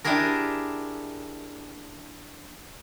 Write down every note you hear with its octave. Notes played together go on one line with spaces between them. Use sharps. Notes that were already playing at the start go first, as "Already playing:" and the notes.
D4 E4 G4 G#4 A#4